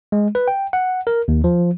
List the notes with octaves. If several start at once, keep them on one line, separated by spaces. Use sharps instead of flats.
G#3
B4
G5
F#5
A#4
D#2
F3